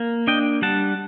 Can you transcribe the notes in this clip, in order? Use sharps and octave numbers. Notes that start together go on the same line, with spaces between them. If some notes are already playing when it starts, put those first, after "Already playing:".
Already playing: A#3
D4 D#5 G5
G3 F#5 A5